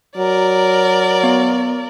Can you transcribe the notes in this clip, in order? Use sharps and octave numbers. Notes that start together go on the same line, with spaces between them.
F#3 A#4 D5
B3